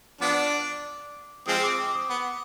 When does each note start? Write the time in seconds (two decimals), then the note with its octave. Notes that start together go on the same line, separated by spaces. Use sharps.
0.21 F3 B3 D4 D6
1.46 F3 G#3 C4 D#6
1.63 D6
1.79 D6
1.95 D#6
2.10 B3